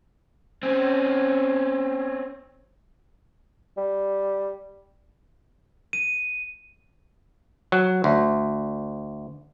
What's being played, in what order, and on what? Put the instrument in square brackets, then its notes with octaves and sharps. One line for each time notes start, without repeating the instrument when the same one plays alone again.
[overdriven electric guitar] C4 C#4
[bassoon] G3
[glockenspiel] D#7
[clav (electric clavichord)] F#3
D2